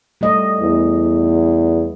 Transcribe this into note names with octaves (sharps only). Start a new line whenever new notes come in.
G3 A3 D#5
E2